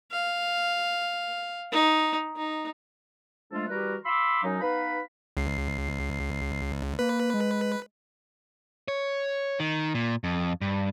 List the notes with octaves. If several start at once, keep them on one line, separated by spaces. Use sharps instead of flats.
F5
D#4
D#4
F3 G#3 A3 D4 F4 A4
E3 G3 F#4 G4 A#4 B4
F5 B5 C6 D6 E6
F#2 F#3 C#4 D#4
B3 D#4 B4 F5 B5
C#2 C7
A#3 B4
G#3
C#5
D#3
A#2
F2
G2